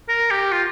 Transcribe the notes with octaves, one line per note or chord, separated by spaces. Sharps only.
A#4
G4
F4